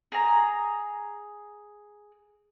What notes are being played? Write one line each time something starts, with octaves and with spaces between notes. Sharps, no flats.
G#4 A#5